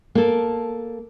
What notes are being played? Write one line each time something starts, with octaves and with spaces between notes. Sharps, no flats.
A#3 A4